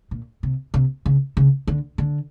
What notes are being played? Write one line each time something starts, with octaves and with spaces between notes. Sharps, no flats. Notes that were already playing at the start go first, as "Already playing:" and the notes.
A#2
C3
C3
C#3
C#3
D3
D3